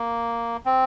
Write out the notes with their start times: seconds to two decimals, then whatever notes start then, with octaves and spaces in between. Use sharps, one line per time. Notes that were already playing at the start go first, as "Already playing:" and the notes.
Already playing: A#3
0.66 C4